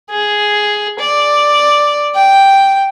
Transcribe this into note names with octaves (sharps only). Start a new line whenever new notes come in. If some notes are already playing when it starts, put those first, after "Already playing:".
G#4
D5
G5